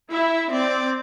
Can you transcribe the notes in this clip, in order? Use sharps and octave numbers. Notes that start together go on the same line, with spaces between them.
E4 E5
C4 D5